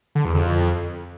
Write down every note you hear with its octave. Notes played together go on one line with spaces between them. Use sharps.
D3
E2
F2